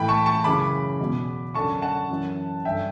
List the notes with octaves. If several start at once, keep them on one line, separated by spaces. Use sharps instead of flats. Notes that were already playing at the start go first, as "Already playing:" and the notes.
Already playing: A2 E3 G5 B5
A5 C#6
A5 C#6
F#2 C#3 E3 B5 D6
E2 B2
F#2 D3 A5 C#6
F#5 A5
F#2 E3
G2 D3 E5 G5